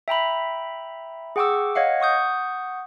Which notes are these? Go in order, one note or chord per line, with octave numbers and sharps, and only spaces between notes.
E5 G5 A#5 B5
G#4 F#5 G5 C#6 D6 E6
C#5 D#5 F5 F#5
F#5 C#6 D#6 G6